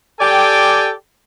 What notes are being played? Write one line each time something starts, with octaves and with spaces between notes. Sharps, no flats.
G4 A4 D5 G5 G#5